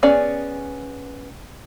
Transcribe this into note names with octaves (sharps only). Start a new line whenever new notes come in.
B3 C#4 G#4 D5